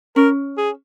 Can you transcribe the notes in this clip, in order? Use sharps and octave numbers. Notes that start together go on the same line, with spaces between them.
C#4 A#4
G#4